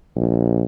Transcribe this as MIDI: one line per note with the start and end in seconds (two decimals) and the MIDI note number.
0.16 0.65 34